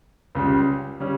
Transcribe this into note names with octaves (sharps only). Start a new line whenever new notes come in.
C#2 C#3 G3
C#3 G3 C#4